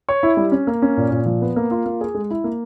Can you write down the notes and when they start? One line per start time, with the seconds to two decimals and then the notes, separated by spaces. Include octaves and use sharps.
0.09 C#5
0.23 E4
0.37 G3
0.52 C#4
0.67 A#3
0.82 C#4
0.97 A#2
1.11 A#2
1.26 F3
1.42 B3
1.56 A#3
1.71 F4
1.86 A#3
2.01 G#4
2.15 G#3
2.31 E4
2.44 A#3